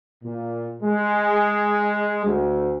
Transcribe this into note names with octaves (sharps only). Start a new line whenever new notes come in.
A#2
G#3
D2